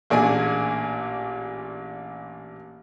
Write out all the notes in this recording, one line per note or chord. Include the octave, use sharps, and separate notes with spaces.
A1 A#2 D4 G#4 G#5